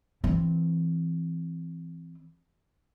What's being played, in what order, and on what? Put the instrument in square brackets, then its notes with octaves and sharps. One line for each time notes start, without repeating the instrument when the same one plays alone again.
[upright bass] E3 C4